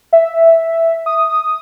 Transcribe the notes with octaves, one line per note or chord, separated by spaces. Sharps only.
E5
D#6
D#6